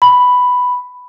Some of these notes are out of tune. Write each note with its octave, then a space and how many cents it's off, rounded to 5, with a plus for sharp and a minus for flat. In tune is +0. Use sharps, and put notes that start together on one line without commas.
B5 +5